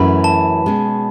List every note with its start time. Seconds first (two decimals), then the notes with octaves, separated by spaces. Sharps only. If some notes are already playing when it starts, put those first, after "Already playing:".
Already playing: F#2 E3 A3 C#4 F#4 B5
0.24 A5
0.66 B2 G#3 C#4